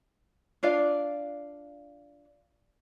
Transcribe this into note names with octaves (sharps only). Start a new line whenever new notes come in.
D4 F4 D5 F5